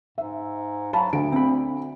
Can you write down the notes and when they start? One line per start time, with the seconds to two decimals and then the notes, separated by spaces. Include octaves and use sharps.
0.18 G#2 E5
0.93 F#3 F5 A5 B5
1.13 D2 D3 D7
1.32 C4 B5